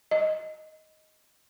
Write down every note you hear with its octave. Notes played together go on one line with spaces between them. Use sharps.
D#5